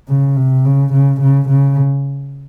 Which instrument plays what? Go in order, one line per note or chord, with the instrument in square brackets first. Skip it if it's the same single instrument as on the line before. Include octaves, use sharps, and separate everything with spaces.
[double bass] C#3
C3
C#3
C#3
C#3
C#3